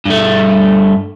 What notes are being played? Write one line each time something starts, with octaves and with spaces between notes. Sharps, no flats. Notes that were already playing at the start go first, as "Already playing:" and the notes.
G2 A3